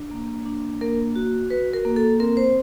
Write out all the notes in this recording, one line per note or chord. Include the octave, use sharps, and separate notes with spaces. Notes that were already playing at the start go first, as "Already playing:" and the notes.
Already playing: D4
A#3
D4
A#3 A#4
F#4
F#4 B4
A#4
A#3
A4
C4 A#4
C5